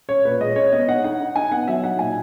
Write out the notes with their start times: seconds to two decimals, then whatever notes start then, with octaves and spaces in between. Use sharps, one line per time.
0.09 C#4 C#5
0.25 A#2 B4
0.41 G#3 D#5
0.56 C#4 C#5
0.72 B3 D#5
0.88 D#4 F#5
1.04 D#4 F#5
1.20 D#4
1.36 D#4 G#5
1.51 B3 F#5
1.67 F#3 E5
1.83 D#4 F#5
1.99 A#2 G#5